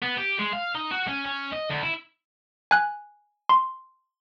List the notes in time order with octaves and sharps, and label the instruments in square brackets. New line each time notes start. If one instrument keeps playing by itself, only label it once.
[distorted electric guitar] B3
G4
G#3
F5
D#4
F#4
C#4
C#4
D#5
D2
E4
[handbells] G#5 F#6
C6